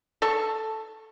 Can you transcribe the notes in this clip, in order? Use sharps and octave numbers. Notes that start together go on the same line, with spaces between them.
A4 C#6